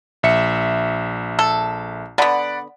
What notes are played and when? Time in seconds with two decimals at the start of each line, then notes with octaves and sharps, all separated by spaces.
0.23 A#1 E5 C#7
1.39 A4
2.18 D3 B3 D5 F#5 B5